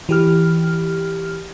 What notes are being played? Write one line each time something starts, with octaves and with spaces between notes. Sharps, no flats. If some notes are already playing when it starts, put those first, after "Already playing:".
E3 G4 F6